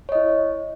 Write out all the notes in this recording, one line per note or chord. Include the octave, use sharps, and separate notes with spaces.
E4 C#5 D#5